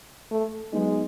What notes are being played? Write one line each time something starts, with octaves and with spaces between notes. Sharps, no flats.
A3
F#3 G#3 B3 D#4